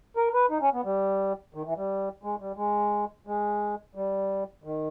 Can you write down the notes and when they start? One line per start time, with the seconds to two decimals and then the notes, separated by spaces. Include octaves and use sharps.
0.17 A#4
0.34 B4
0.50 D#4
0.61 C#4
0.73 B3
0.84 G3
1.55 D#3
1.66 E3
1.77 G3
2.23 G#3
2.40 G3
2.57 G#3
3.27 G#3
3.95 G3
4.64 D#3